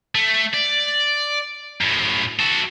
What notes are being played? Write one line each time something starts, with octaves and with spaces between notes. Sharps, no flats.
A3
D5
F#2 A2
F#4 A4